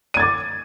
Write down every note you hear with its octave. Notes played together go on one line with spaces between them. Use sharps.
D6 G#6 A6 D#7